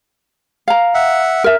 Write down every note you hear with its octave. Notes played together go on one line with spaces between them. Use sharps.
F5 A#5
E5 F#5
A#4 E5